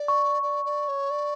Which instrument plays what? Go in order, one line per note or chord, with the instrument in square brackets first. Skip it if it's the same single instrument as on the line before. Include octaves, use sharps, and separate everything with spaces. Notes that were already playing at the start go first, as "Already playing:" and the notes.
Already playing: [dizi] D5
[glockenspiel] C#6
[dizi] D5
D5
C#5
D5